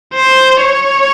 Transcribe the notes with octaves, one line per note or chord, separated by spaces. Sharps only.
C5
C#5